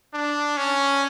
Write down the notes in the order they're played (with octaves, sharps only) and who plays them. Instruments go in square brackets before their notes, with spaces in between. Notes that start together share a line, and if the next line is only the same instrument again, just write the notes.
[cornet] D4
C#4